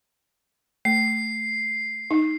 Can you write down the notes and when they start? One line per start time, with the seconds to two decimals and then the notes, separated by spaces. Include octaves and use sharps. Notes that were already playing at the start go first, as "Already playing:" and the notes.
0.85 A3 C7
2.11 D#4